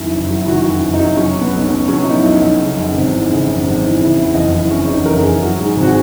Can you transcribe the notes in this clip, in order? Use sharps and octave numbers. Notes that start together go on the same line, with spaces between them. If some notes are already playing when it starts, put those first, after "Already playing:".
Already playing: F#2 D#3 E4
F#1
F#3
E4
D#3 F#4
F#2
E4
F#1
D#4
F#3
F#3 C#4
B2
B3
B1
C#4
B1
F#3 C#4
B2 D#4
E4
B1
D#4
B1
C#3
F#2
G#1
E3
C#3
F#2
G#1
E3
C#3 E4
E2 E4
F#1 D#5
F#1 E4
C#3 C#4
E2 D#4
F#1 A#4
F#1 G#4
F#3 F#4
G#2
G#4
G#1
F#4
G#4